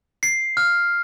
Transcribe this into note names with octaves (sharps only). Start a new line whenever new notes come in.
C7
F6